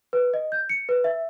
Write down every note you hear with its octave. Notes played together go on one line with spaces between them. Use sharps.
B4
D#5
G6
C#7
B4
E5